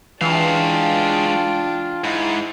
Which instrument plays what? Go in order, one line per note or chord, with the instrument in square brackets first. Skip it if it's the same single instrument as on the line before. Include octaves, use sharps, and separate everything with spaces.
[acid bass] E3 [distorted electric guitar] G#3 F5 [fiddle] D4 G5 [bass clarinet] F4
[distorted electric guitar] G#2 [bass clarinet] E4